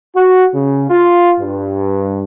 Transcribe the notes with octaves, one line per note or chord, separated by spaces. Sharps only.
F#4
C#3
F4
G2